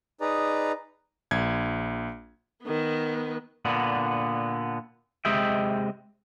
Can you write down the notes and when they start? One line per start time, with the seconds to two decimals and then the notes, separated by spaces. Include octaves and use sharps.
0.21 D#4 G#4 B4 D5 A#5
1.31 A#1 G#6
2.63 D#3 B3
3.65 A#2 D3 B3
5.25 C3 G#3 G4 D#5 E5 G5